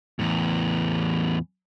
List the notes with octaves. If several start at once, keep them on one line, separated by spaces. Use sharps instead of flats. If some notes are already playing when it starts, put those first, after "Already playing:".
E2 A2